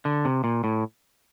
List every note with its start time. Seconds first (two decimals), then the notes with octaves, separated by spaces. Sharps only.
0.05 D3
0.25 C3
0.44 A#2
0.64 A2